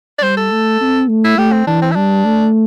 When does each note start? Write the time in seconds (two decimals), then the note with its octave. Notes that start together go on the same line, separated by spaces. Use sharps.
0.19 D5
0.22 G3 C5
0.37 A4
0.51 A3
0.81 C4
1.09 A3
1.24 E4
1.38 A3 G4
1.52 C4
1.67 E3 D4
1.82 C4
1.91 E4
1.96 G3 D4
2.25 A3